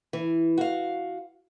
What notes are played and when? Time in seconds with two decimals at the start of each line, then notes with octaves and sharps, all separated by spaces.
0.13 E3
0.58 F#4 F5